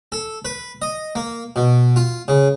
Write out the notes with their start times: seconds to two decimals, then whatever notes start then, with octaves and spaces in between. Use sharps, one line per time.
0.12 A4
0.45 B4
0.82 D#5
1.15 A#3
1.56 B2
1.96 F4
2.28 C#3